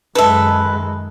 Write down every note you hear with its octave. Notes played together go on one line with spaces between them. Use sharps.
F#2 D#3 G#3 A4 B4 E5